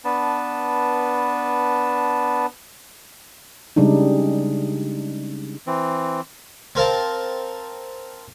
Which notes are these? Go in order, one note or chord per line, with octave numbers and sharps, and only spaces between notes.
B3 D4 B4 A5
C#3 G3 G#3 D4 D#4
E3 C4
C4 A#4 F5 A5